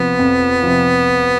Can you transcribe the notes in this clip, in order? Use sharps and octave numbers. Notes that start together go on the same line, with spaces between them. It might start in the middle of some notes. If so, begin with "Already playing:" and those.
Already playing: C3 F3 B3
F2
C3 F3